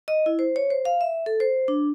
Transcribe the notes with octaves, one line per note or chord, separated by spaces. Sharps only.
D#5
E4
C5
C#5
C5
F5
E5
A4
C5
D4